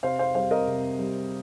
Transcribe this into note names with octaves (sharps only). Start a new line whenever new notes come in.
C3 C5 F5
C5 F5
G3 C5 F5
A#4 D#5
C3
G3